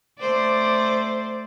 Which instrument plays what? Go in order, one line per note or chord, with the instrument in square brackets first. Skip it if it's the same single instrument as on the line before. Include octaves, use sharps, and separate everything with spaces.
[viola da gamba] A3 C5 D5